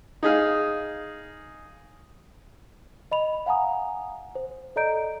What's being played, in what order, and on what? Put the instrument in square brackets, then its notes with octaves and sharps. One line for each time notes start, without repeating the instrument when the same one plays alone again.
[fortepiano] D#4 G#4 F5
[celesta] D#5 B5 F7
F5 F#5 G#5 A#5 D#6
C5
A4 D5 D#5 A#5 G6 D7